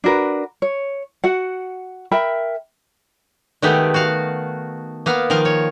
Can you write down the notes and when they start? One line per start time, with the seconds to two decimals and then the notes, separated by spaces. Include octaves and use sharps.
0.04 D4 F#4 A#4 B4
0.62 C#5
1.24 F#4 F#5
2.11 A#4 E5 G5 B5
3.62 D#3 G#3 A3 B3 G4
3.94 F#4 F5
5.06 A#3 B3 F5
5.30 D#3 F3 A#4 F5
5.45 C#5